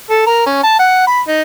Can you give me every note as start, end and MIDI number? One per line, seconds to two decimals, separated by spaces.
0.10 0.22 69
0.27 0.45 70
0.46 0.59 61
0.63 0.76 81
0.80 1.07 78
1.07 1.21 83
1.28 1.41 63